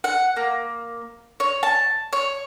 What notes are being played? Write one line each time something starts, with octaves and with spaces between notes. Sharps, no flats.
F#5
A#3
C#5
A5
C#5